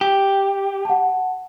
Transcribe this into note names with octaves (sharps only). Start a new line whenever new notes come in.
G4
F#5 A5